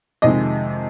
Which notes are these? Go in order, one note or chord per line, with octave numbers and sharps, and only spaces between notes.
F2 C3 D#3 G#3 D#5